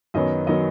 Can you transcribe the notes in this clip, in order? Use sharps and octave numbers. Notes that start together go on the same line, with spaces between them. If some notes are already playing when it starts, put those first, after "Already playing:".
F#2 D#3 F#3 B3 D#5
D#3 F#3 B3 D#5